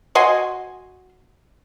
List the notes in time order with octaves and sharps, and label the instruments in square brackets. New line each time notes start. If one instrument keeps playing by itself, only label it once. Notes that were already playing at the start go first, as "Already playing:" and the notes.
[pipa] F#4 D#5 G#5 C6